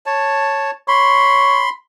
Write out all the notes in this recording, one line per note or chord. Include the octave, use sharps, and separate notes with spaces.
C#5 A5
C#5 B5 C6